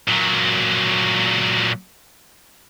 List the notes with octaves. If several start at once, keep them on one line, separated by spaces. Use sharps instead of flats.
A#2 F#3